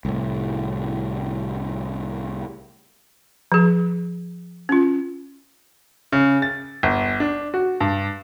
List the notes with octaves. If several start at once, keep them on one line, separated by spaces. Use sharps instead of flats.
C2 A2
F3 G#4
C#4 F4
C#3
A6
G1
D4
F#4
G2